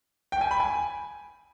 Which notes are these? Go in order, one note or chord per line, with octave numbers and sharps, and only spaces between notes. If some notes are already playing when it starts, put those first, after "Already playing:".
G5
G#5
B5
G#5